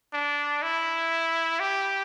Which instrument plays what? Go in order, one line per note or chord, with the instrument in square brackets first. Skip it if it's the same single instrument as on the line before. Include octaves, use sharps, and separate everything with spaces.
[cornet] D4
E4
G4